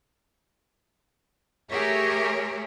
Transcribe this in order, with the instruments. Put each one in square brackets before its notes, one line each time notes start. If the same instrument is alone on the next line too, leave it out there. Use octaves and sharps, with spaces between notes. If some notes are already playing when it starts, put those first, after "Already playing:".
[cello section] A3 G4 G#4 A#4 C#5 E5